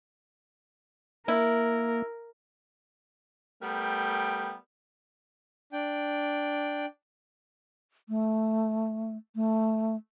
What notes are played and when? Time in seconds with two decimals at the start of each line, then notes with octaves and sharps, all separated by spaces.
1.28 A#3 E4 A#4
3.62 G3 A3 B3 A#4 G5
5.73 D4 G5
8.09 A3
9.35 A3